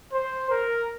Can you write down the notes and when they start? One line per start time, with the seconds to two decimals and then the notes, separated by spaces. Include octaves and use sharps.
0.13 C5
0.50 A#4